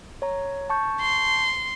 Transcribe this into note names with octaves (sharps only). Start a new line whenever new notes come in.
C#5 A#5
A5 C#6 G6
C6